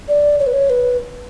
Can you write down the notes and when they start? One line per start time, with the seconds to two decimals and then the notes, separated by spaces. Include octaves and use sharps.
0.08 D5
0.40 C#5
0.47 B4
0.53 C#5
0.70 B4